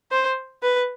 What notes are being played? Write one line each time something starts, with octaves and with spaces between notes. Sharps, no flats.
C5
B4